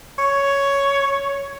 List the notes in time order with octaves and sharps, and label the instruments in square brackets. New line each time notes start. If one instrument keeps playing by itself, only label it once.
[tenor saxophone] C#5